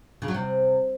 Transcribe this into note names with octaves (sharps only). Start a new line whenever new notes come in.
C#3
F#3
C3